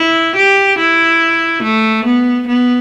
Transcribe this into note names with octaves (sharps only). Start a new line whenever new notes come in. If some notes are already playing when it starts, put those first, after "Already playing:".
Already playing: E4
G4
E4
A3
B3
B3